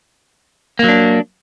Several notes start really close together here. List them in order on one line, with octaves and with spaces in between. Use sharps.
A#3 F#3 D4